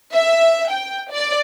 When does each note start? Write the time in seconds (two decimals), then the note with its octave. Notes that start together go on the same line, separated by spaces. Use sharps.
0.14 E5
0.71 G5
1.12 D5